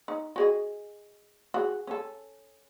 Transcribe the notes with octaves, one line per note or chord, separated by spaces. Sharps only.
D#4
F#4 G#4 D#5
F#4 G#4
C#4 A4